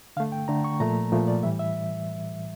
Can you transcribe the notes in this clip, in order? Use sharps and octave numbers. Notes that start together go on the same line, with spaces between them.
D3 A3 F5
G5
D3 A3 A#5
C#6
A#2 F3 A3 A#5
A#2 F3 A3
D5
A2 E3 G3 E5
E5